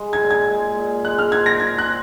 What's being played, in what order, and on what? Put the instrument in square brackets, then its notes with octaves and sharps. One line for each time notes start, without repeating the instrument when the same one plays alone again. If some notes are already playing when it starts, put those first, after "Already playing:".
Already playing: [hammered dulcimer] G#3
[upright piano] G#6
[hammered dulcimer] A#2
[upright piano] G#6
[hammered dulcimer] G#3
A#2
[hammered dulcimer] G#3 [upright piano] F#6
[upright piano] F6
[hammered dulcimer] C5 [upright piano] G#6
[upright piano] A#6
[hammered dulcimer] F4 [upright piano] G#6
[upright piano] F#6
[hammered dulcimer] C5